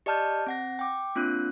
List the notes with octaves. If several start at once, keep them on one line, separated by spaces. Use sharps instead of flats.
G4 D5 D#5 A5 F6 G6
C4 F#5 A#6
G5 D6
A#3 C4 D4 F4 F#6